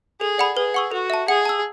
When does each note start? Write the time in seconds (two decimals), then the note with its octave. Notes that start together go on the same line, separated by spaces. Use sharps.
0.20 G#4 A4
0.38 D5 F#5 B5
0.57 G#4 B4
0.74 F#5 C#6 E6
0.91 F#4 A4
1.10 E5 A5
1.28 G#4 F#5
1.45 A5 E6